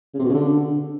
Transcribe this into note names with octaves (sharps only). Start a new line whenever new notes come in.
C#3
C3
B2
C#3
D3